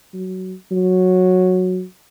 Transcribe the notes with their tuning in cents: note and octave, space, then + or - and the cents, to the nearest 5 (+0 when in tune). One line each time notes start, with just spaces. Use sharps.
F#3 +10
F#3 -10